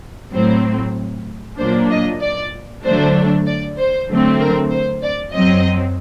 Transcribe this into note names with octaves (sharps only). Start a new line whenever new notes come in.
A2 F#3 C4 C5
A#2 F#3 A#3 D4 C5
D#5
D5
D3 F#3 A3 D4 C5
D5
C5
D3 F#3 A3 C4
A#4
C5
D5
F#2 F#3 C4 D#5